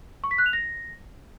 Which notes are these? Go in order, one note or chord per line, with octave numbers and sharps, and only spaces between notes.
C#6
B6
F#6
F7
A#6